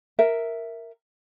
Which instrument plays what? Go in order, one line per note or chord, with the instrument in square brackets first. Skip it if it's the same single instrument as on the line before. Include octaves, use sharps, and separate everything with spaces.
[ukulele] A#4 E5